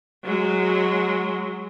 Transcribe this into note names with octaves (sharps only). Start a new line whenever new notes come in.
F#3 G#3